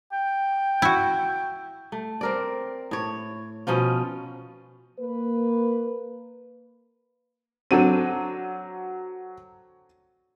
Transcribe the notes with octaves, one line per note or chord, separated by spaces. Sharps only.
G5
E4 F#4
A3
C4 A#4 D5
A2 C#5
B2 F3 C#4 F4
A#3 B4
F#3 C4 D4 A4 D#7